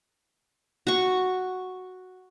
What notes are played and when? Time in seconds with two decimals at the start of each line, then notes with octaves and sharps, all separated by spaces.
0.87 F#4 C#6